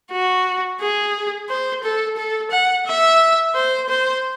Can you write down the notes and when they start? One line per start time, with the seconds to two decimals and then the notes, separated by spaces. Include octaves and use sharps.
0.11 F#4
0.80 G#4
1.49 C5
1.83 A4
2.17 A4
2.51 F#5
2.86 E5
3.55 C5
3.89 C5